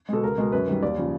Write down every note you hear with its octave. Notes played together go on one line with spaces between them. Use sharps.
B2 G#3 A4
C#2 A#4
B2 G#3
F#2 B4
D#3 G3
D#2 D5
C#3 F3